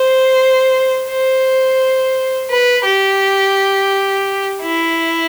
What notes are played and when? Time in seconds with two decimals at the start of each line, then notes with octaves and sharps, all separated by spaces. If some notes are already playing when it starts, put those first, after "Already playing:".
Already playing: C5
1.09 C5
2.50 B4
2.85 G4
4.63 E4